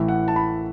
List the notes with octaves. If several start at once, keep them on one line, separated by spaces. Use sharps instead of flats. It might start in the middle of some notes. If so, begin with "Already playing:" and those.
Already playing: A1 A2 E3 E5
F#5
A5
B5